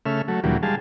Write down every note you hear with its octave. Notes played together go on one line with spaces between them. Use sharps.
C#3 A3 E5 F6
F#3 A3
D2 A#2 E3 F#3 G3
G3 G#3 F5 A5